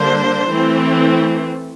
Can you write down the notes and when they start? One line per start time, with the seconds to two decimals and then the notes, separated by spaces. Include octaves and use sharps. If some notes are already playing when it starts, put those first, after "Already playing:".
Already playing: D3 G3 A#3 D4 C5
0.49 E3 A3 C4